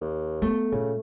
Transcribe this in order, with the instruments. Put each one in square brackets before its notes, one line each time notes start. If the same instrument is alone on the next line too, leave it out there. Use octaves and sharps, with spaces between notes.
[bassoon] D#2
[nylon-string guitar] A3 [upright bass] B3
[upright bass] A#2 [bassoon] C#3